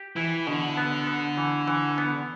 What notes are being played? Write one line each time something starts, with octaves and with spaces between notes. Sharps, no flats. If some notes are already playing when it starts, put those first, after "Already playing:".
Already playing: G4
E3 E4
B2 D3
B3
B3
E3
E3
B3